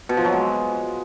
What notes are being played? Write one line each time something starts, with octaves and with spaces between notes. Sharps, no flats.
B2
F3
F#3
G#3